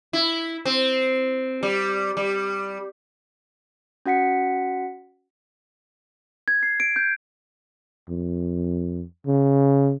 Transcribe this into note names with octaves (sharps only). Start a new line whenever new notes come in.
E4
C4
G3
G3
C#4 F#4 F#5 B6 C#7
G#6
C7
D7
G6
F2
C#3